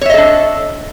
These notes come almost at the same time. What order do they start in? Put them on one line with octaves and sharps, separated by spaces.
C#5 E5 D#5 A4 D4